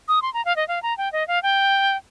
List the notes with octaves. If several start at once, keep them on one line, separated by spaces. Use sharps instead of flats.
D#6
C6
A#5
F5
D#5
F5
A#5
G5
D#5
F5
G5